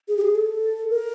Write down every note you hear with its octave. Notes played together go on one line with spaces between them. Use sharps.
G#4
G4
G#4
A4
A#4